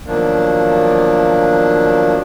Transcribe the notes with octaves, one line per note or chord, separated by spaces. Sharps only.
B2 D#3 F3 F#3 A#3 D4